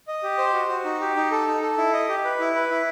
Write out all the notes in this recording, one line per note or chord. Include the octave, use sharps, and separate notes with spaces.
D#5
G4
C5
F#4
F#4
D#4
G4
D#4
A4
D#4
A4
E4
D#5
G4
B4
E4
B4
E4